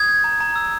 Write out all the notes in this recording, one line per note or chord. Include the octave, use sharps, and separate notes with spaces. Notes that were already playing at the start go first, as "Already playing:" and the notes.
Already playing: D#6 G#6
G6
A#5
A#5
E6